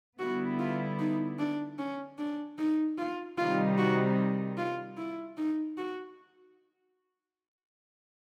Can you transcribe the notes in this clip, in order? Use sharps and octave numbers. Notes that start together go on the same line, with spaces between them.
D3 G3 B3 E4 F#4
F4
D#4
D4
C#4
D4
D#4
F4
C3 D#3 G3 C4 D#4 F4
F#4
F4
E4
D#4
F#4